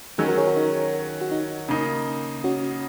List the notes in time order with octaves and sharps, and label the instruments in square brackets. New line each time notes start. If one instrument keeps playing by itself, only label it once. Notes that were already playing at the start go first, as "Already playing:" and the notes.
[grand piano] D#3 F#3 C#4 [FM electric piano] D#4 G#4
[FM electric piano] F#4 A#4
G#4 C#5
F#4 A#4
D#4
F#4
D#4
[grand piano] C#3 A#3 D#4
[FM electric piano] C#4 F#4